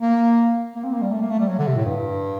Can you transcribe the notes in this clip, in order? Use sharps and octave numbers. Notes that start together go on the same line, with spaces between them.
A#3
A#3
C4
A#3
G3
A3
A#3
A3
G3
F#3
D3
C3
A2
G2